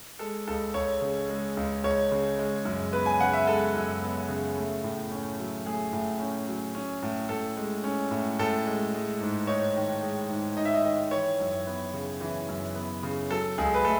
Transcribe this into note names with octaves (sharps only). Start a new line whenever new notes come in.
G#3 A4
C#2 A4
C#2 C#5
C#3
G#3
C#2
C#2 C#5
C#3
G#3
F#2
B3 B4
G#5
C#3 F#5
E5
G#3 A4
F#2
B3
C#3
A3
A2
C#4
F#3
A3 G#4
A2
C#4
F#3
C#4
A2
A2 A4
G#3
C#4
A2
A2 A4
G#3
G#3
G#2
D#4 C#5
D#3
G#3
G#2
D#4 D#5
E5
D#5
D#3 D#5
E3 C#5
F#2
B3
C#3
E3
F#2
B3
C#3
F#3 A4
C#2 G#4
B4
A3 A4